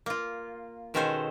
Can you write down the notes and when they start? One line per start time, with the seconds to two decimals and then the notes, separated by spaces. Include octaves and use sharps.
0.06 A#3 F4
0.94 B2 D#3 G#3 C#4 A4 C5